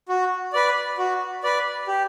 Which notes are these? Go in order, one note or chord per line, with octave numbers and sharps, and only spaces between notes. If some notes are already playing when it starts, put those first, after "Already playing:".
F#4
B4 D5
F#4
B4 D5
G4